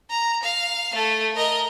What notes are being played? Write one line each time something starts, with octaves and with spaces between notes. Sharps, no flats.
A#5
F5
A3 A4
A#4 D#5